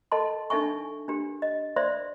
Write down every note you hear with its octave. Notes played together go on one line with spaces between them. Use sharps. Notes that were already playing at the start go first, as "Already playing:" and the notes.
A4 D#5 A5 C6
D4 D#4 A4 E5 G#5 C#6
D4 G4
D#5
C5 D5 E5 C6